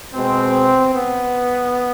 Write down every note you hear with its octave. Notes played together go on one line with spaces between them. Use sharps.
B2 G#3 C4
B3